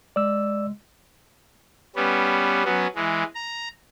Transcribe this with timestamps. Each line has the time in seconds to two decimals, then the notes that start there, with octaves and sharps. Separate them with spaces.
0.16 G#3 D5 E6
1.96 G3 B3 C#4
2.65 F#3 B3 C#4
2.95 E3 G#3
3.35 A#5